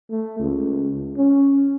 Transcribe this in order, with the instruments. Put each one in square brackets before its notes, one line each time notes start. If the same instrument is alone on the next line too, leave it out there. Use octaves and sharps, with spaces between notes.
[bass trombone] A3
C#2
C#4